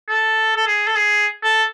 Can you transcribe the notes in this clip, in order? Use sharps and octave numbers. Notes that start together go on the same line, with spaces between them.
A4
A4
G#4
A4
G#4
A4